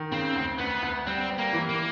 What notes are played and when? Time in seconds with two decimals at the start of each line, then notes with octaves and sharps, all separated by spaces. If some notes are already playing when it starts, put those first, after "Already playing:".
Already playing: D#3
0.12 C#3 C4
0.35 D2
0.59 D2 B3
0.82 D2
1.06 G3 C4
1.30 G3
1.38 A#3
1.53 E3
1.69 A#3